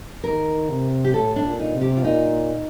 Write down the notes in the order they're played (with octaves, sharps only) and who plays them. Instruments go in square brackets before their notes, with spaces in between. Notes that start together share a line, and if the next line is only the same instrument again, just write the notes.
[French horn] D#3 [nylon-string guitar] A#4
[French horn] C3
[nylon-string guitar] G4
[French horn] A2 [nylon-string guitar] A4
[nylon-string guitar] D4
[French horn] A#2
[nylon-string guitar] D#4
[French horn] C3
[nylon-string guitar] G4
F4
[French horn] A#2 [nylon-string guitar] D#4